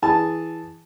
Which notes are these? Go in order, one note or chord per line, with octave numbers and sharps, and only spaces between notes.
E3 G#4 A5